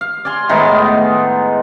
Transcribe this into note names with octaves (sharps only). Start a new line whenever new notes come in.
F5
D5 F5 G#5 C6
A2 D#3 G#3 B3